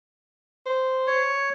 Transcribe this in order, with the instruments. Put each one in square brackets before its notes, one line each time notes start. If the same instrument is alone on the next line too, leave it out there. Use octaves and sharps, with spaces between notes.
[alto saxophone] C5
[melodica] C#5